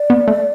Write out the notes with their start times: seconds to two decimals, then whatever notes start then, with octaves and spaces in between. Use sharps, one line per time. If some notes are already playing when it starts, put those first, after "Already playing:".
Already playing: D5
0.10 B3
0.28 A3